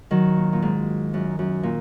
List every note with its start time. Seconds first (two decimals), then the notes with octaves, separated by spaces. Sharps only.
0.11 D#3 F#3
0.37 A#2
0.53 A#2
0.62 G#2
1.14 F#2
1.39 F#2
1.63 A#2